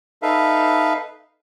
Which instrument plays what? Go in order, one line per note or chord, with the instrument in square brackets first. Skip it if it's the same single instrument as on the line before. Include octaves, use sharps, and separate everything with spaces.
[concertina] D#4 A4 B4 E5 F5